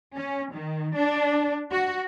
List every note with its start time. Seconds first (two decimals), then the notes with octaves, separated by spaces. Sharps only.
0.16 C#4
0.52 D#3
0.96 D4
1.72 F#4